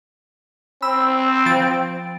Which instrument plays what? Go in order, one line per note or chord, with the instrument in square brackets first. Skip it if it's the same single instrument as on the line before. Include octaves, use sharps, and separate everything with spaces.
[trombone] C4 [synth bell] B5 E6
[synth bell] F3 A6 D7